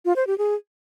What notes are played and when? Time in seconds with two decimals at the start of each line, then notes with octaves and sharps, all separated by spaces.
0.05 F4
0.16 C5
0.27 G4
0.38 G#4